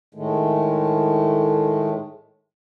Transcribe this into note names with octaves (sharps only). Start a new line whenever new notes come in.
A2 D#3 G#3 A3